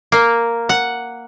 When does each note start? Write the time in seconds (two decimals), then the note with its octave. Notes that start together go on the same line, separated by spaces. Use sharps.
0.12 A#3
0.69 F#5